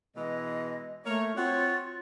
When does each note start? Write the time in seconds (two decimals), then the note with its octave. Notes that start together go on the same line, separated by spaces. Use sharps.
0.16 B2 E3 G#3 D#5
1.05 A3 A#3 A#4 C#5
1.36 C4 F4 F#4 C#5